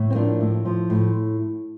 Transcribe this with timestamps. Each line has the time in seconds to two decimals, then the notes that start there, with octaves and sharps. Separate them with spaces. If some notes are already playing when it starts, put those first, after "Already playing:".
Already playing: A2
0.10 C4
0.15 F3 A#3 D4
0.41 A2
0.65 F3
0.90 A2